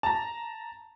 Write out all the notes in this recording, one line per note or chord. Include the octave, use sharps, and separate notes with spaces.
A5 A#5